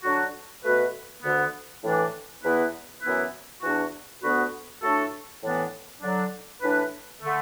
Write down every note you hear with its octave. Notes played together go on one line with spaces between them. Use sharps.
D3 F#3 D4 F#4
B2 A3 F#4 B4
D2 D3 B3
A2 E3 D4
E2 E3 B3 E4 B4
F#2 E3 B3 E4 B4
E2 E3 D4 F#4
D2 D3 B3 F#4 B4
A2 A3 D4 F#4 A4
A2 E3 B3 D4
D3 F#3 D4
A2 E3 D4 B4
D3 A3